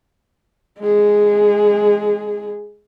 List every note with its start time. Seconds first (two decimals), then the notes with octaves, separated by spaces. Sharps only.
0.79 G#3 G#4